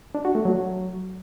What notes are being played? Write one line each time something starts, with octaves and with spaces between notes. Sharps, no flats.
D4
F#4
A3
F#3